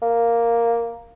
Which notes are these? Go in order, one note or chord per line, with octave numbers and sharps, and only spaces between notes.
A#3